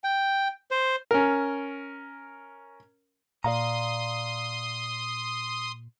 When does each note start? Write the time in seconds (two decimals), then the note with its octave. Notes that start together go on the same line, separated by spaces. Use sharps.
0.04 G5
0.71 C5
1.11 C#4 A#4
3.44 A#2 D5 F5 A#5 C6 D#6